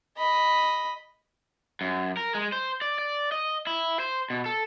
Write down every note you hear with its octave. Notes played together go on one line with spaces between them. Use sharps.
D#5 B5
F#2
A#4
G#3
C5
D5
D5
D#5
E4
C5
B2
A4